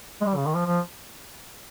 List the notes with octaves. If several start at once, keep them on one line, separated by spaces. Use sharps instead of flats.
G#3
G3
C#3
D#3
F3
F3